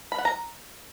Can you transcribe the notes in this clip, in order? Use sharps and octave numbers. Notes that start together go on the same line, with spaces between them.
B5
F#5
A#5